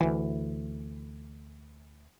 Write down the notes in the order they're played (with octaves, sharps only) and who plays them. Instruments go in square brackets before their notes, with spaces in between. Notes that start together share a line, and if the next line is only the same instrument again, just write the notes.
[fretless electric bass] D2 E3